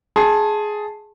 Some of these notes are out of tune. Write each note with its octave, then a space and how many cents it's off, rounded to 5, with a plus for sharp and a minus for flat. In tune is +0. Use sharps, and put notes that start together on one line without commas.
G#4 +10 A5 +0 C6 +35